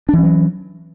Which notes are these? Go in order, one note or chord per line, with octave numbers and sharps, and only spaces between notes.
E3 F#3 C#4 D4